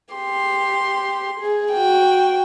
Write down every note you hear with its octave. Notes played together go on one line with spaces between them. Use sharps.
G4 C6
G#4
F#4 G5